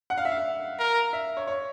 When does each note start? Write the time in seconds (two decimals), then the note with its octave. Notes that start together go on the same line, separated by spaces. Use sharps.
0.10 F#5
0.18 F5
0.25 E5
0.32 F5
0.79 A#4
1.13 E5
1.37 C#5
1.47 C#5